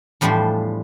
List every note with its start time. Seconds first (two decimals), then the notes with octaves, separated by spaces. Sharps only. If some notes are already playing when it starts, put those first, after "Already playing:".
0.21 E2 A2 F3 G3 D4 C5